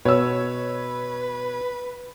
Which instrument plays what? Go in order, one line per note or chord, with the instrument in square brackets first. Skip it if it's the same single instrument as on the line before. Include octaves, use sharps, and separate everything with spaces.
[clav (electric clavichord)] B2 [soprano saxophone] B4 [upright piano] C#5 E6